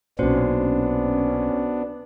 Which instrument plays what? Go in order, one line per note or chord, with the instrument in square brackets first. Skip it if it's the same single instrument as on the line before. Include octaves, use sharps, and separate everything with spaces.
[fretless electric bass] B1 A#2 [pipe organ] B3 D4 [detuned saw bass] C#4 [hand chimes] F#4 C5